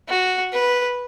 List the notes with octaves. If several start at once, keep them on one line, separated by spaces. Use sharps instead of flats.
F#4
B4